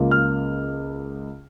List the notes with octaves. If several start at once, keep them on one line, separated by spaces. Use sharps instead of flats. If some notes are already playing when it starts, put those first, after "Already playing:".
Already playing: C#2 C#3 A#3 F4
F6